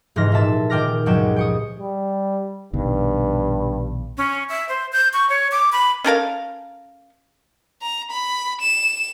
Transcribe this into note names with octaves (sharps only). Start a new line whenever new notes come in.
F1 G#2 E3 C6 F6 A#6
A#2 E5 A5 E7
A#2 D#3 G5 D6 F6 A#6
C#2 G2 F3 F#3 G5 E7
G5 C#6 D#6
G3
A#1 G2 B2 D#3
C#4
E5
C5
G6
C#6
C#5
D6
B5
C#4 A4 A#4 F5
A#5
B5
E7